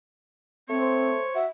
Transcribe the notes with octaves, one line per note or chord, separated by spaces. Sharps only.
A3 C4 C#5
C5
F#4 E5